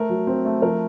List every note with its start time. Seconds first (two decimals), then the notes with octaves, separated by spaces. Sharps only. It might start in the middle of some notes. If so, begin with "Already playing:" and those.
Already playing: A3 A#4
0.09 F#3
0.27 C4
0.45 A3
0.62 F3 A#4